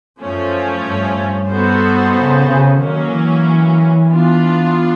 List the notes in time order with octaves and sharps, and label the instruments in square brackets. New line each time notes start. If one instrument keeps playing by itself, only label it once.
[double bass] F#2 [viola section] F3 A3 C#4
[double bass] G2
G2
[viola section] B3 D#4 F#4 A4 C5
[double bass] C#3
C#3
[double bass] D#3 [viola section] F#3 A#3 C#4
[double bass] E3
[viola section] B3 D4 F4